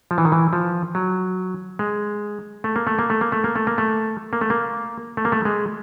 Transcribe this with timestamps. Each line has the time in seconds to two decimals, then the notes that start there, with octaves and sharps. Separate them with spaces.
0.11 F3
0.18 E3
0.25 D#3
0.32 E3
0.53 F3
0.95 F#3
1.79 G#3
2.64 A3
2.76 A#3
2.87 A3
2.99 A#3
3.10 A3
3.21 A#3
3.32 A3
3.44 A#3
3.56 A3
3.67 A#3
3.78 A3
4.33 A#3
4.41 A3
4.50 A#3
5.17 A3
5.25 A#3
5.32 A3
5.45 G#3